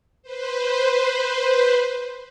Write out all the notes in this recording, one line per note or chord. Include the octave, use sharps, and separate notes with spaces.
B4 C5